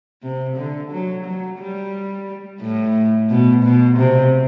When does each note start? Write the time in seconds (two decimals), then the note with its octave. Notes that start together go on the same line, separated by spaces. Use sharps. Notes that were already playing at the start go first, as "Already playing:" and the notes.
0.23 C3
0.56 D3
0.91 F#3
1.24 F#3
1.59 G3
2.61 A2
3.30 B2
3.64 B2
3.97 C3